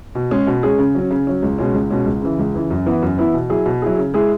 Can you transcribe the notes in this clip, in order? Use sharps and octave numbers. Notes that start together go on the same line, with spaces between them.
B2
G#3 C#4 G#4
B2
G#3 C#4 G#4
C#3
F#3 C#4
C#3
F#3 C#4
C#2
B2 G#3 C#4
C#2
B2 G#3 C#4
C#2
C#3 E3
C#2
C#3 E3
F#2
E3 B3 E4
F#2
E3 B3 E4
B2
F#3 E4 G#4
B2
F#3 E4 G#4
C#3
G#3 E4 G#4